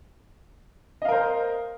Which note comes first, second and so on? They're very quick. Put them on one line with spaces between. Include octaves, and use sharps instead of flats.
D#5 F5 A#4 C5